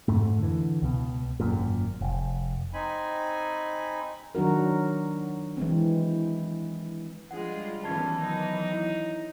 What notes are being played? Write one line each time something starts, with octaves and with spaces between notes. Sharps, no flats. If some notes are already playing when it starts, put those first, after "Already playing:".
F2 G#2 A3
D3 E3
C#2 B2
G#1 F#2 A#2
F1
C4 D#4 G#5 B5
D#3 F#3 D4 F#4 A#4
E3 G#3 C4
F3 G3 G#3 D4 F4 G#4 F#5
D#3 E3 B3 C#4 A5 G#6
F#3 D#4
E4